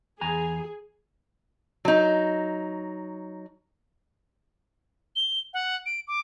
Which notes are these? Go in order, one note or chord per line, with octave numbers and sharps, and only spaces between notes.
E2 G#4 G#5 A#5
F#3 D#4
G7
F#5
D7
D6